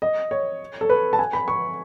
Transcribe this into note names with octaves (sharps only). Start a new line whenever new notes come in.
D#5
C#5
A4
B4
A5
G#5
B5
C#6